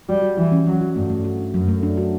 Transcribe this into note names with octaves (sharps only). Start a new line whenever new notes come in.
G3 F#4
F#4
E3 F#4
C#4
F#3 C#4
F#4
G2 A3
A3
F#4
D4
F#2 F#3
A3
D4
F#4